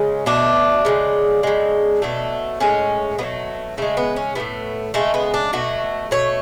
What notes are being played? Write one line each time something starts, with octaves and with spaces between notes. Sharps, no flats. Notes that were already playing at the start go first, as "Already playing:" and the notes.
Already playing: C#3 G#3
B2 A3 D4
C#3 E3 G#3
C#3 G#3
B2 F#3 A3
A2 G#3 C#4
B2 F#3 A3 B3
C#3 G#3 A3
B3
C#4
A2 F#3 A3 B3
C#3 E3 G#3 A3
B3
D4
B2 F#3 A3 F#4
B2 A3 C#5